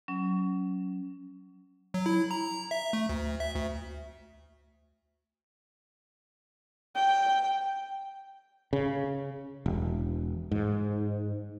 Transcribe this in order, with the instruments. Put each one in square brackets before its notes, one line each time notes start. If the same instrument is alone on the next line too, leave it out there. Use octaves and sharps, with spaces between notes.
[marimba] F#3 C#4
[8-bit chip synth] F#3
E4
A#5
E5
A3
D2
E5
D2
[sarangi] G5
[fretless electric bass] C#3
E1
G#2